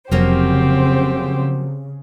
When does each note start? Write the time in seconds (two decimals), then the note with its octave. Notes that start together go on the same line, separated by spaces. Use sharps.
0.11 F1 C#3 F3 F#3 A#3 C4 G4 C5